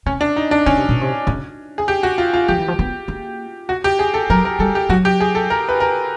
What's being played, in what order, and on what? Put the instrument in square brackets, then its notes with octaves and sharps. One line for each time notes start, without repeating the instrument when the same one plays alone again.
[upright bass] C3 [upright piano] C#4
[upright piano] D4
D#4
D4
[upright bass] C#3 [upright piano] C#4
[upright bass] C3
B2
C3
C#3
[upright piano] G#4
G4
F#4
F4
F4
[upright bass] F3 [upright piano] G4
[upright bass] E3
F3
B3
A#3
[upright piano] F#4
G4
G#4
A4
[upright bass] F#3 [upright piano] A#4
[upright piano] A#4
[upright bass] G3 [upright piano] A4
[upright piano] G4
[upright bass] F#3 [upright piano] F#4
[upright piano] G4
G#4
A4
A#4
B4
A#4